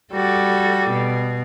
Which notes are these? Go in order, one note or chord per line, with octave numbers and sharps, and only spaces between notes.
G3 F#4 A4
B2